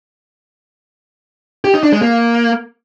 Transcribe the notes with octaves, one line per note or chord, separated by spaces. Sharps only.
G4
D#4
D4
G#3
A#3